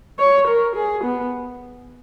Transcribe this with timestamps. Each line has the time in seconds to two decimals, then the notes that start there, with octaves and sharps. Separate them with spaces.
0.19 C#5
0.48 A#4
0.76 G#4
1.04 B3